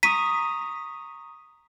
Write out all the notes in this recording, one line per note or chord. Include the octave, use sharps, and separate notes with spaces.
A#5 C#6 D#6 B6 D#7